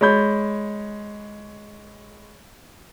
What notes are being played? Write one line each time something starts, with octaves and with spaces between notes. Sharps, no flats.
G#3 C#5 B5 G6